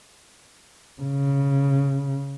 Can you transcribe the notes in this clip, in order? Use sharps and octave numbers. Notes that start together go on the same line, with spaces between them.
C#3